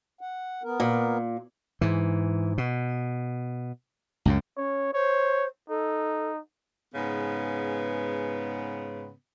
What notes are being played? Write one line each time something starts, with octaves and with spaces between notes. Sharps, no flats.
F#5
B3 A#4
A#2
G#2 E3
B2
C#2 F#2 C#3
C#4 C#5
C5 C#5
D#4 A4
G#2 C#3 B3